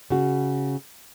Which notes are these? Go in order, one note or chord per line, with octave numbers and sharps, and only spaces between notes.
C#3 F#4